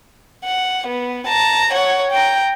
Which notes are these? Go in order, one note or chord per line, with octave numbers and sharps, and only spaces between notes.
F#5
B3
A5 A#5
C#5 F#5
G5 A#5